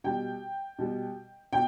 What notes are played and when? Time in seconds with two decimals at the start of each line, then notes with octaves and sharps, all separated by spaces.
0.04 B2 G3 G5
0.79 B2 G3
1.52 B2 G5